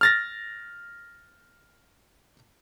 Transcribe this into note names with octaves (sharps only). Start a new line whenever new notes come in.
F6 A6 A#6